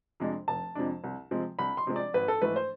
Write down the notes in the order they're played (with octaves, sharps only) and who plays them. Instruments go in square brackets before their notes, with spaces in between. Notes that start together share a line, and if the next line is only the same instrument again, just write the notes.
[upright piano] F2 C3 G#3 D4
F1 A5
F2 C3 G#3 D4
C2
C3 F3 G#3 C4
C2 B5
C6
C3 F3 G#3 C4
D5
G#1 B4
A4
G#2 E3 A3 B4
C5